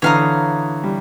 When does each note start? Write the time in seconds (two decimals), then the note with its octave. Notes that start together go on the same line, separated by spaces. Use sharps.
0.02 D3 E3 C#5 F5 A#5 D#6
0.83 G3